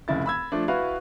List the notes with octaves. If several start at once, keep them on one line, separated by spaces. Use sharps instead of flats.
F1 C#3 E4 A6
B5 E6 G#6
F3 A3 D4
E4 F#4 B4 F5